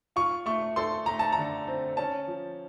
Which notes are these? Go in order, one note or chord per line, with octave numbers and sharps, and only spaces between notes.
F4 C#6
A3 C#6
A4 C6
A3 A#5
A5
D3 A#5
C4
C#4 A5
F3